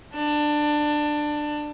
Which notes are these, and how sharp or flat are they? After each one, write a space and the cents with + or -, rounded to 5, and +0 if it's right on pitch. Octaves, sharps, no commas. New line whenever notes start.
D4 +15